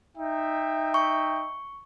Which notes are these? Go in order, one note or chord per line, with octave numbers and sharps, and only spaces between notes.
D#4 E5 G5
C#6